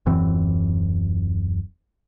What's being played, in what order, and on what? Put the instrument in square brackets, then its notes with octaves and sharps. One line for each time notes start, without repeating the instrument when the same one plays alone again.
[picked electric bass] D#1 F#2 E3 C4